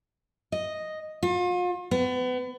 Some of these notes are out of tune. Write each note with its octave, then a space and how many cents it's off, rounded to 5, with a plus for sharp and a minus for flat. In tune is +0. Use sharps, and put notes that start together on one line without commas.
D#5 +0
F4 +40
B3 +30